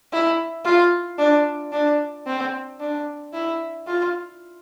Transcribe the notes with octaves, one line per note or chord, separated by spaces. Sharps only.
E4
F4
D4
D4
C4
D4
E4
F4